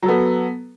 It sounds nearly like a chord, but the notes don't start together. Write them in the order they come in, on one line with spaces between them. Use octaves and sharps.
F#3 A4 B3